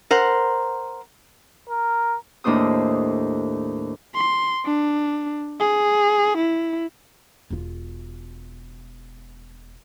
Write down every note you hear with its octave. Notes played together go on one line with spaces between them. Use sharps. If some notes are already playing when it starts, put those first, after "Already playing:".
A#4 C5 F#5
A#4
D#2 A2 D4 C5 D#6
C6
D4
G#4
E4
E1 F4